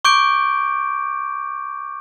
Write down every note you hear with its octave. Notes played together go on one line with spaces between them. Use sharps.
C#6 D6 G6 D7